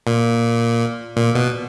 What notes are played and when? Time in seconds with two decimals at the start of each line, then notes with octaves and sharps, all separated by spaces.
0.07 A#2
1.17 A#2
1.35 B2